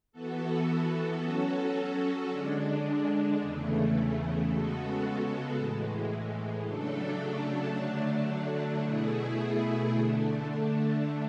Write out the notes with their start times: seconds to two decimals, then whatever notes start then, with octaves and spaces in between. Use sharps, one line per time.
0.12 E3 B3 F#4 A4
1.20 F#3 C#4 F#4 A4
2.29 D3 G#3 D4
3.39 E2 C#3 E3 A3
4.47 C#3 G#3 B3 F#4 A4
5.56 A2 E3 G#3
6.65 C#3 F#3 A3 D4 A4
7.73 D3 F#3 A3 D4
8.82 B2 A3 E4 G#4
9.90 D3 A3 D4